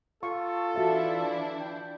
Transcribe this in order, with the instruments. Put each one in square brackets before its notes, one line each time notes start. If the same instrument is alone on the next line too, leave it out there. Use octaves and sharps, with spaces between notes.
[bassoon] F4 [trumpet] A4 [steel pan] C#6
[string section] E3 D4 E4 [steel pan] F#4 E5
[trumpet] G5